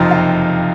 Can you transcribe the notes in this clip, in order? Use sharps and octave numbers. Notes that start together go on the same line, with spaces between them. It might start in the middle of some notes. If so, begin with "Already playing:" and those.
Already playing: F#1 F2 C3 F3 D#4 F4
F4
D#4